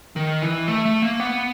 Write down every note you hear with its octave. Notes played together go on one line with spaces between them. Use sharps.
D#3
E3
A3
A3
A#3
B3